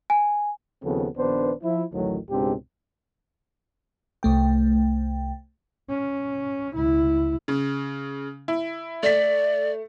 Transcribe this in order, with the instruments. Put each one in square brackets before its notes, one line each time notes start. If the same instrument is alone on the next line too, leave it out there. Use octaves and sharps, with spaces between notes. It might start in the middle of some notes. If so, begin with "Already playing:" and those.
[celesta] G#5
[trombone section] D#2 C#3 F3 B3 C4 A4
A#1 D#3 B3 D4 B4 C5
F3 E4
A1 D2 A2 D#3 F#3
C#2 G#2 B2 C4 D4 G4
[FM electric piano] C2 A3 G5
[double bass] C#4
C#2 E4
[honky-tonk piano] C#3
E4
[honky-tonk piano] A3 B6 [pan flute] D5